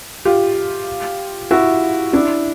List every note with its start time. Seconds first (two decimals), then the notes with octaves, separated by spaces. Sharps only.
0.25 F4 G4
1.51 E4 F#4
2.13 D4 E4